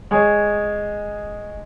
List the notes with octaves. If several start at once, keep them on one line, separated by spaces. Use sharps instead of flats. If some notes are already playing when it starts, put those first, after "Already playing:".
G#3 G#4 C#5